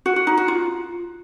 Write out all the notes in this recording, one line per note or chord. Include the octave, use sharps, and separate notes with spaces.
F#4
F#4
D#4
F#4
F4